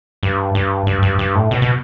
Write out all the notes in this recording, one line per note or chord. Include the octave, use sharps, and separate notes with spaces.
G2
G2
G2
G2
G2
A2
B2
B2